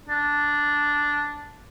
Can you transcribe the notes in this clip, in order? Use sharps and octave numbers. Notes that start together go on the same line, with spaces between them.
D4